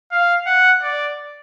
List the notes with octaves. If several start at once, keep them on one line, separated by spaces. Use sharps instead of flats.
F5
F#5
D5